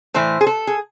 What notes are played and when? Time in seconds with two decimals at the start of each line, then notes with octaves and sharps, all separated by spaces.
0.14 A2 E3 A3 C5
0.41 G#4
0.47 A4
0.67 G#4